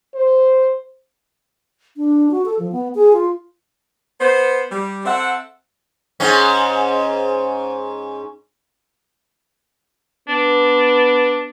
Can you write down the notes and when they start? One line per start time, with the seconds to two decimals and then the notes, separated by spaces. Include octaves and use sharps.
0.15 C5
1.97 D4
2.31 F#4
2.46 A4
2.59 F3
2.72 B3
2.95 G#4
3.13 F4
4.21 B3 C5
4.71 G3
5.06 C4 A4 E5 F#5
6.20 G#2 C#4
10.29 B3 D4